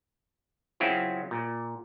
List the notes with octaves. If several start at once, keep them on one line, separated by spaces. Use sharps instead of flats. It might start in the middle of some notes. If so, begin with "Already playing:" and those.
C#3 F#3 C4 C#4 E4 F4
A#2